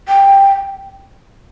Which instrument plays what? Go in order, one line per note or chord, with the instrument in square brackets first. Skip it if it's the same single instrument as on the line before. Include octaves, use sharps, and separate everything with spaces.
[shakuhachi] G5